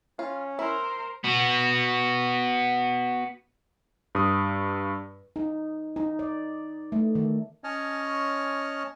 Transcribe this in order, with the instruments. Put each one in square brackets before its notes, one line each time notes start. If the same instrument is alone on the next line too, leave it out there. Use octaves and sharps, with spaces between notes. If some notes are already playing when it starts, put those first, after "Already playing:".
[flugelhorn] C#4 [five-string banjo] F4
[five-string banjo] E4 [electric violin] A#4 C5
[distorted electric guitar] B3 F#4
[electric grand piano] G2 D#6
[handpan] D#4
D#4
D5
A3
D#3
[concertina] C#4 C#5 D#5 A5 F6